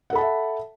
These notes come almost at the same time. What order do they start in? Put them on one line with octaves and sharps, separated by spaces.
F#5 A4 B5 A5 E5